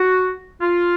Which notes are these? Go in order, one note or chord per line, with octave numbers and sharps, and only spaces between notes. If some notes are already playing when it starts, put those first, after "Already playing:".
Already playing: F#4
F4